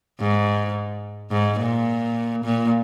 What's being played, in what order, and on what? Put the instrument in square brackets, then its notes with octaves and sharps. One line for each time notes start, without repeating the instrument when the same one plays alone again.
[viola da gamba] G#2
G#2
A#2
A#2